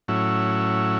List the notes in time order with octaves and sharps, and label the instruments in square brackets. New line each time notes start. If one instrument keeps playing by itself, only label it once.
[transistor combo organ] A2 F#3 C#4 E4